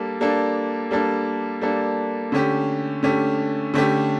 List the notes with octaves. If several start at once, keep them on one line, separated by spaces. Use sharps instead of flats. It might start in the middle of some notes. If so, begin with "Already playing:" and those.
Already playing: G3 A#3 D4 A4
G3 A#3 D4 A4
G3 A#3 D4 A4
G3 A#3 D4 A4
D3 A3 C#4 G4
D3 A3 C#4 G4
D3 A3 C#4 G4